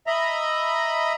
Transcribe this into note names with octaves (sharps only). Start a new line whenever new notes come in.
D#5 E5 A#5 B5